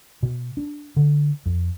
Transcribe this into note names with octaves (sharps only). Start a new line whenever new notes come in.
B2
D4
D3
F2